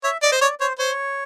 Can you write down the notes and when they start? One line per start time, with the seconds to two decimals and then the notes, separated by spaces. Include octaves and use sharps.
0.04 C#5 E5
0.22 D5 D#5
0.32 C5
0.41 C#5 D5
0.60 C5 C#5
0.79 C5 C#5